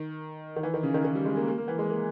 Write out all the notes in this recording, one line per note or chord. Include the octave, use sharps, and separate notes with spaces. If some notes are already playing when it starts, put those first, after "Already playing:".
Already playing: D#3
D#3
E3
D#3
C#3
D#3
D#3
G3
G#3
A#3
A#3
A#3
E3
G#3
A#3